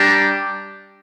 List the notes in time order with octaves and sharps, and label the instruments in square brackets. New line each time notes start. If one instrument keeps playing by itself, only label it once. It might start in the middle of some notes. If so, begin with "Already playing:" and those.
Already playing: [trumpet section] G3 D4 G4 A#5